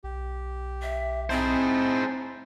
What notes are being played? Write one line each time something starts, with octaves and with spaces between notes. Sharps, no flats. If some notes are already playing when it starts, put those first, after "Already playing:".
B1 G4
E5
C4 D#4 E4 G#4 C5 A5